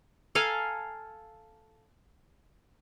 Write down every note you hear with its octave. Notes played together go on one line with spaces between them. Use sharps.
A4 F5 G#5 A#5